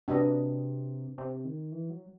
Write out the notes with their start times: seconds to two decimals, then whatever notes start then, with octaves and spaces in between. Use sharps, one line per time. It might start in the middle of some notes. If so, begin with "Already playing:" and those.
0.08 C3 D4 F#4 B4 D#5
1.18 C3
1.45 D#3
1.72 E3
1.90 F#3